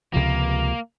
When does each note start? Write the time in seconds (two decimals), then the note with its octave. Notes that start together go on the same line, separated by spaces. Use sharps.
0.14 C#2 C3 F3 A#3